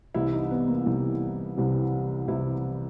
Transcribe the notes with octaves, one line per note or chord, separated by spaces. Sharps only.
C2 C3 E3 G3 E4
D#4
B3
A#3
C2 C3 E3 G3
C2 C3 E3 G3
C2 C3 E3 G3 E4